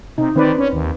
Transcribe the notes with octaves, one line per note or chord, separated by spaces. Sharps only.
C3 D#4
D#3 C4 B4 D5
C#4
D#2